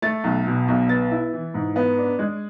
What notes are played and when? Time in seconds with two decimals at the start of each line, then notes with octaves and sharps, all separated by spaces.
0.02 A3 A6
0.24 B1
0.46 B2
0.68 B1
0.89 B3 A6
1.11 E4
1.33 E3
1.54 G#2
1.76 B3
1.98 D4
2.19 G#3